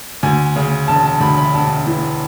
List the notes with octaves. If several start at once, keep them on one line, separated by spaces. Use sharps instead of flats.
D2 G#5
C#3
E1 A5
A5
D2 B5
B5
E1 A5
E3